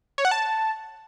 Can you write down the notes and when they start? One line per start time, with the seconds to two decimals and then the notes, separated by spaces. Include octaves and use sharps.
0.18 C#5
0.25 F#5
0.31 A5